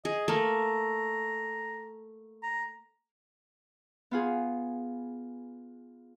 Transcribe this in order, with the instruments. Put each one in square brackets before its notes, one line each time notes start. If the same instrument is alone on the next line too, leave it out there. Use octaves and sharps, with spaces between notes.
[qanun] G#4 [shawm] D#5
[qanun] A3 A#3 [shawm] A#5
[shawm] A#5
[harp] B3 F4 G#4